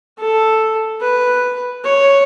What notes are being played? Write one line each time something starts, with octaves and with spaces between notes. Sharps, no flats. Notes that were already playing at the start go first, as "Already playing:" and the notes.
A4
B4
C#5